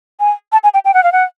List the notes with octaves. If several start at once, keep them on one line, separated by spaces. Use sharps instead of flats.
G#5
A5
G#5
G5
G5
F#5
F5
F#5